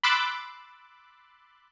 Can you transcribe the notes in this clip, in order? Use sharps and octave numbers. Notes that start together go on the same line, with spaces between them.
B5 C6 D6 E6 F#6 A6